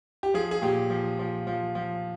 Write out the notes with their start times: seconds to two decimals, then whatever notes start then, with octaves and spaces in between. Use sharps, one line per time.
0.23 G4
0.34 F3 G#4
0.51 G#4
0.62 A#2 G4
0.90 F3
1.19 F3
1.47 F3
1.75 F3